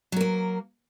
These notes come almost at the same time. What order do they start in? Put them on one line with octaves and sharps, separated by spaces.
F#3 A#4 A#3